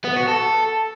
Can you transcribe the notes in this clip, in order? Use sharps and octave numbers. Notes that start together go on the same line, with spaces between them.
B3
F#4
A4